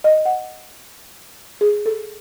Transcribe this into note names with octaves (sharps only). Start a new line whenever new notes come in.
D#5
F#5
G#4
A4